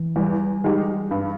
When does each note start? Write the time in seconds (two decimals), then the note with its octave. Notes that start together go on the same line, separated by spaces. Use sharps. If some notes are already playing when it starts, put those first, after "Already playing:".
Already playing: E3
0.16 E2 G3
0.64 D#3 G#3 D#4 G4
1.11 G2